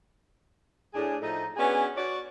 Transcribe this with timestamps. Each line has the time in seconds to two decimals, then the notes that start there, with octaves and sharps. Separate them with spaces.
0.94 A2 D4 G#4
1.22 A2 F3 A3 D#4
1.57 B3 C#4 D4 F#4 G#4 B4
1.96 F#4 C#5 D5